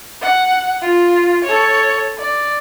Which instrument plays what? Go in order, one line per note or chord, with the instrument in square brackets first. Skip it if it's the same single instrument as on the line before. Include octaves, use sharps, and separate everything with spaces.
[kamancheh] F#5
F4
A4 C#5
D5